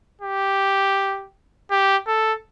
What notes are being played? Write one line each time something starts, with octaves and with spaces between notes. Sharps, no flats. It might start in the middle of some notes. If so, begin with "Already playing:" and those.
G4
G4
A4